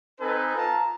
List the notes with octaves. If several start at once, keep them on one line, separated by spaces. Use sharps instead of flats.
C4 D#4 A4 B4 G#5
F4 A5 A#5